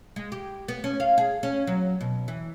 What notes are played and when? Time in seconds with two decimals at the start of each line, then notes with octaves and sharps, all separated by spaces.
0.16 G#3
0.32 G4
0.68 B3
0.84 C#4
1.00 F5
1.18 G#4
1.43 C#4
1.67 F#3
2.01 B2
2.28 E3